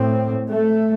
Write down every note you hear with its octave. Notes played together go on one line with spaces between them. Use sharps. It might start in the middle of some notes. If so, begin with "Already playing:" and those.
Already playing: A2 C4
A3